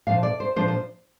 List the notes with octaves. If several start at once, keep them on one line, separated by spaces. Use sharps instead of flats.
A#2 F3 D4 F5
D5
C5
A#2 F3 D4 C5
C5